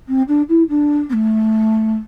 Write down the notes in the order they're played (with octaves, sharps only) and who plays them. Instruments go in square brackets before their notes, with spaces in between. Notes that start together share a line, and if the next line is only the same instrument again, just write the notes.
[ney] C4
D4
E4
D4
C4
A3